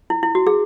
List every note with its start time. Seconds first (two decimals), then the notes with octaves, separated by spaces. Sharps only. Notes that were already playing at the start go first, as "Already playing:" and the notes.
0.10 E4
0.23 E4
0.35 F#4
0.47 G#4